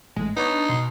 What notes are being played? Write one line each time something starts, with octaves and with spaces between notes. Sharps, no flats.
A1 A2 G#3
B3 D4 D#4 B4 C#5
B2 C6